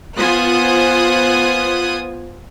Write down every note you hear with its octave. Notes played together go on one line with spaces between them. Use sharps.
B3 F4 C5 G#5 D#6 F#6